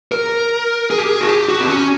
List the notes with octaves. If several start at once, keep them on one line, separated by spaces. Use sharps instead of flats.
A#4
G#4
G4
G#4
F#4
G4
F#4
C4
C#4